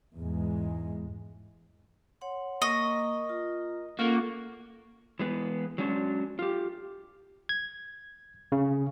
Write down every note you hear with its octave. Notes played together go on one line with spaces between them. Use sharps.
E2 G#2 G#3
C#5 F#5 C6
A#3 A#4 D#5 C#6
F4
A#3 C#4 F4 F#4 A4
E3 G#3 B3
F#3 G#3 C#4 D4 F4 F#4
F4 G4
G#6
C#3